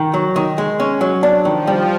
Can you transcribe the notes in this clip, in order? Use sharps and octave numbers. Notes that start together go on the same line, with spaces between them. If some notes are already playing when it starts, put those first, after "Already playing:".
Already playing: D#3
F#3
D#3
G#3
C#4
F#3
D4
D#3 F3
G3